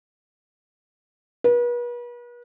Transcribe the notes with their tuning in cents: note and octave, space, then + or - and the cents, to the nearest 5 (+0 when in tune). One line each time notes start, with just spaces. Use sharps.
B4 -40